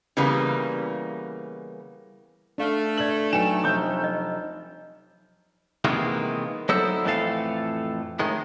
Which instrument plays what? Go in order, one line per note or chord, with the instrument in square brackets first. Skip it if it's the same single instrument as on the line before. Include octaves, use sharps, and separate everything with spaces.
[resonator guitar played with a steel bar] C#3 E3 G3 A#3 B3
[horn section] A3 [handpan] D4 F5
[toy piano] B4 D5 [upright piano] F#7
[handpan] F#3 D#4 [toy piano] B4 G5 G#5 [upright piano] E7
[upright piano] F1 G6 [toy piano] E5 D#6
[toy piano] D#5
[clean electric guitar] C3 D#3 E3 G#3 A#3 B3
F#3 B3 D#4 E4 A4 C5
F2 A2 E3 A3 A4 F5
A2 D#3 G#3